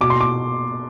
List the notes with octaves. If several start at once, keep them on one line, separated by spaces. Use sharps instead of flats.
B2 D6
C6
D6